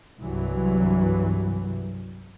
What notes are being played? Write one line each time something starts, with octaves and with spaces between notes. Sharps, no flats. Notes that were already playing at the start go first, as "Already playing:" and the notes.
C2 G2 E3 F#3